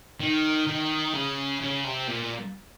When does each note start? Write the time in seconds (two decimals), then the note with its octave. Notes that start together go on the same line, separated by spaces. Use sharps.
0.20 D#3
0.67 D#3
1.13 C#3
1.61 C#3
1.84 C3
2.08 A#2